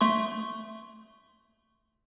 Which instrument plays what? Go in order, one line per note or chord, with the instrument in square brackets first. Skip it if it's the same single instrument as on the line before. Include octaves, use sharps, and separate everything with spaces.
[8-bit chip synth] A3 C6 C#6